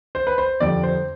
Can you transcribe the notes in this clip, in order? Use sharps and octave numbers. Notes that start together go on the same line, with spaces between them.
C5
B4
C5
F2 D3 G3 D5
C5